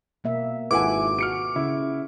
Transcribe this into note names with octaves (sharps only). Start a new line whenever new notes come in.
B2 A#3 E5
G#1 E4 F4 A4 B4 F#5 G#5 D6
F#4 F6 C#7 D7
C#3 E4